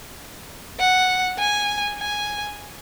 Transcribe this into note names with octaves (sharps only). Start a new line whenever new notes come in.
F#5
G#5
G#5